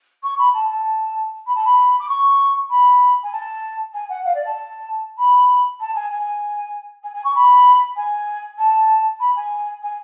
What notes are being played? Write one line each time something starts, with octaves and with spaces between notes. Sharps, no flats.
C#6
B5
A5
A5
B5
A5
B5
D6
C#6
B5
G#5
A5
G#5
F#5
F5
D5
A5
B5
A5
G#5
G#5
G#5
G#5
C#6
B5
G#5
A5
B5
G#5
G#5